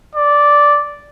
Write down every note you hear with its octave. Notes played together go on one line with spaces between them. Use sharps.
D5